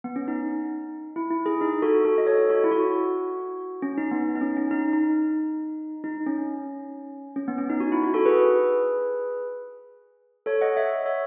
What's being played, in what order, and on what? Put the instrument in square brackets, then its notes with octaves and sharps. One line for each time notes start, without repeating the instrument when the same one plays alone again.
[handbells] B3
C#4
D#4
E4
E4
G#4
D#4
F#4 A4
F#4 A4
D#5
A4 C#5
F#4 A4
E4
F#4
C#4
D#4
B3
D#4
C#4
C#4
D#4
D#4
D#4
C#4
C#4
B3
C#4
D#4
F#4
E4
F#4
F#4 A4
G#4 B4
A4 C#5
D#5 F#5
C#5 E5
C#5 E5